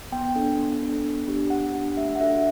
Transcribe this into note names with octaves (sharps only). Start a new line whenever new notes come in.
B3 G5
D4 A4
B3
D4 A4
B3
D4 G4
B3 F#5
D4 G4
A3 E5
F#5
D4 F#4 A4 E5